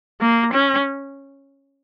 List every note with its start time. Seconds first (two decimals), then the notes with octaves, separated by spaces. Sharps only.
0.20 A#3
0.54 C#4